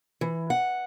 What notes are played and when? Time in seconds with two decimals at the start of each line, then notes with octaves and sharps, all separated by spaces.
0.21 E3
0.50 F#5